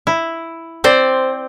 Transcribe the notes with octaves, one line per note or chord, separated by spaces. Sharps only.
E4
C4 C5 D5